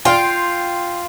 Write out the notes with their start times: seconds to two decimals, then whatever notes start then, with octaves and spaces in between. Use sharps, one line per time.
0.05 F4 G5 C6